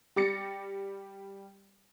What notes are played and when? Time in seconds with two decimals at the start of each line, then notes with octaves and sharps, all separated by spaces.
0.16 G3 G4 D6 A6 A#6 C#7